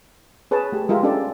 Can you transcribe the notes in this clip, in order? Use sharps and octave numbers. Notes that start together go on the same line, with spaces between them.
G#4 B4 C#5 A5
A3 G4
G#3 F4 G4 A#4 E5
C#4 D4 F4 G4 A4 D5